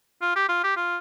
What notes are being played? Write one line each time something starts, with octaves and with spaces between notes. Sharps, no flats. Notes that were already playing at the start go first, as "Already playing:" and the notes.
F4
G4
F4
G4
F4